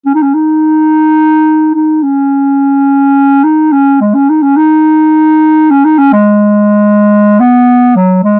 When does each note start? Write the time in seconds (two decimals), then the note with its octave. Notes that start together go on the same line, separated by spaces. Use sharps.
0.06 C#4
0.15 D#4
0.22 C#4
0.34 D#4
1.75 D#4
2.03 C#4
3.44 D#4
3.72 C#4
4.01 G#3
4.14 C#4
4.30 D#4
4.43 C#4
4.57 D#4
5.71 C#4
5.85 D#4
5.98 C#4
6.13 G#3
7.40 B3
7.96 F#3
8.24 G#3